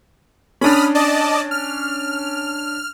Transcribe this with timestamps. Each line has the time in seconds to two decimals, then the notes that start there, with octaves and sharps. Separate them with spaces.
0.61 C#4 D4 B5 D#6 F6
0.95 D5 D#5 A5
1.51 F6